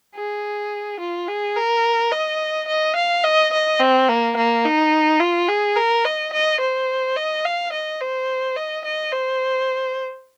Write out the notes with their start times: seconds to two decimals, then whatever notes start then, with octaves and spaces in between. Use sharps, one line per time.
0.16 G#4
1.00 F4
1.28 G#4
1.56 A#4
2.12 D#5
2.68 D#5
2.96 F5
3.24 D#5
3.53 D#5
3.80 C4
4.09 A#3
4.37 A#3
4.65 D#4
5.20 F4
5.48 G#4
5.76 A#4
6.05 D#5
6.33 D#5
6.60 C5
7.17 D#5
7.45 F5
7.73 D#5
8.01 C5
8.56 D#5
8.85 D#5
9.13 C5